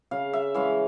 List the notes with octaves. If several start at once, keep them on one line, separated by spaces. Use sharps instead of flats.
C#3 F5
E5
E3 G#3 C#4 F5